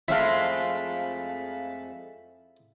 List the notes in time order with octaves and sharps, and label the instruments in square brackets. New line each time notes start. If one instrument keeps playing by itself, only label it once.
[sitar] F2 G#3 A3 [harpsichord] E4 [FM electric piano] F5 B6